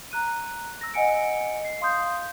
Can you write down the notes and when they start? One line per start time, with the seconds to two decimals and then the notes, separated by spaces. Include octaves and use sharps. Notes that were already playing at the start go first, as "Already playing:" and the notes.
0.11 A#5 F#6 D#7
0.81 E6 A#6
0.94 D#5 F#5 G#5 C#7 D7
1.65 C7
1.81 F5 C6 D#6 G6 C7